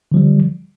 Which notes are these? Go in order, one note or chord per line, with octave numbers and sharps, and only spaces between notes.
D3 F3 G3